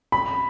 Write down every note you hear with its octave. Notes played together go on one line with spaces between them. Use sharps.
B5